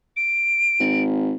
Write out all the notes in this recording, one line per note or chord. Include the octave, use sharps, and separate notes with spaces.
D7
G#1